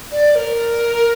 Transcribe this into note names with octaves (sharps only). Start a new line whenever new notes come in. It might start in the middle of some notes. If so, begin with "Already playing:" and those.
D5
D5
A#4